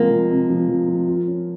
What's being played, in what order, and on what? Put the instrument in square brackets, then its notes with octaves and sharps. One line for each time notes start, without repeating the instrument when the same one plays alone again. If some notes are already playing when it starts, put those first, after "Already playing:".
Already playing: [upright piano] C3 F3 G#3 [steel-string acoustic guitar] A#3
[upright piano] F3
C3
F3
F3
F3
F4
C#4